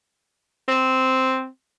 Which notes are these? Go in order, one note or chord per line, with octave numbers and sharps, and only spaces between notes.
C4